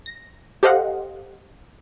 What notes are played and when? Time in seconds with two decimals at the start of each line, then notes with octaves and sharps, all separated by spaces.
0.06 A#6
0.63 G4 A4 C5 D#5 F5 F#5